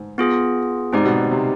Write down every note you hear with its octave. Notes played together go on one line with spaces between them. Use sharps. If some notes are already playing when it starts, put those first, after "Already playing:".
Already playing: G#2
B3 F4 G#4
G#2 C4 D#4 G4 D5
B2
C3